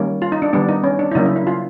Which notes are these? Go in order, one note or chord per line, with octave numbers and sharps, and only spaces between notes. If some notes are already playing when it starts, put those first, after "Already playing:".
Already playing: D#3 G3 A#3 C#4
F4
D#4
D4
D#3 G3 B3 D4
D#4
C#4
D4
E4
C#3 F#3 A#3 C#4 D#4
E4
E4
F4